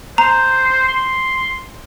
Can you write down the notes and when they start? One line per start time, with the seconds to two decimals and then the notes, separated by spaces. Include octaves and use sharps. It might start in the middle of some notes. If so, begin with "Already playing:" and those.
0.18 C5 A#5
0.88 C6